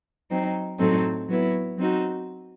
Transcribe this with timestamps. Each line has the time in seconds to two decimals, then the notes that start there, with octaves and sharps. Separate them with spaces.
0.31 F#3 C4 D#4
0.79 A2 F#3 C4 D#4 A4
1.29 F#3 B3 E4
1.78 F#3 C4 D#4 F#4